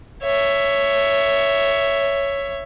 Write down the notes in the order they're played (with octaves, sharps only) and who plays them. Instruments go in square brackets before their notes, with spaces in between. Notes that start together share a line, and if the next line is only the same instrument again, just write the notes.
[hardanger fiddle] C#5 E5